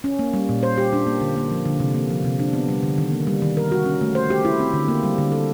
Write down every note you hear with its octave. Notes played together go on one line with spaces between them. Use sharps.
C#4
A#3
G3
A#2
C5
G4
D4
A#3
D3
A#3
F3
D3
C3
A#3
F3
C3
D4
B3
G3
D3
D#3
A#3
G3
D#3
A#4
F#4
C#4
A3
C5
G4
E4
C4
D3
A#3
G3
D3
A4